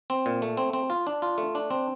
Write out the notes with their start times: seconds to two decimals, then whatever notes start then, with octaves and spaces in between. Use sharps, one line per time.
0.10 C4
0.26 A#2
0.42 A3
0.57 C4
0.73 C4
0.90 F4
1.07 D4
1.22 F4
1.38 A3
1.55 D4
1.71 C4